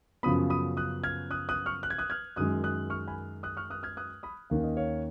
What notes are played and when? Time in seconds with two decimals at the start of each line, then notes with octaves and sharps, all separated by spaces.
0.23 F#2 C#3 F3 B3 B5 D#6
0.50 B5 D#6
0.77 D#6 F#6
1.03 F6 G#6
1.31 D#6 F#6
1.49 D#6 F#6
1.66 C#6 F6
1.83 F#6
1.90 G#6
1.98 D#6 F#6
2.10 F6 G#6
2.36 F#2 D#3 G#3 D#6 F#6
2.64 D#6 F#6
2.90 C#6 F6
3.07 G#5 B5
3.43 D#6 F#6
3.57 C#6 F6
3.70 D#6 F#6
3.83 F6 G#6
3.97 D#6 F#6
4.23 B5 D#6
4.50 D#2 D#3 A#3 C#4 F5
4.64 D#5
4.77 C#5 F5